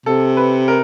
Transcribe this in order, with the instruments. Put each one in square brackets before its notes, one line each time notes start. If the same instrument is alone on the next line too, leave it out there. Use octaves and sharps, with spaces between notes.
[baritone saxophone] C3 [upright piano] A4
[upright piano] B4
A#4